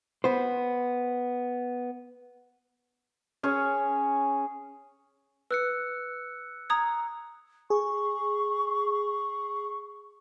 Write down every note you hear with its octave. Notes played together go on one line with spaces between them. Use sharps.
B3 C5
C#4 G#4 C#5
B4 E6 F#6 C#7
A#5 D#6 G#6
G#4 C#6